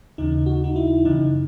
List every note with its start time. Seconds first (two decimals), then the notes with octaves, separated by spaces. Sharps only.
0.18 D#2 C#3 E3 D#4
0.46 F#4
0.64 D#4
0.76 E4
1.05 F#2 C#3 E3 D#4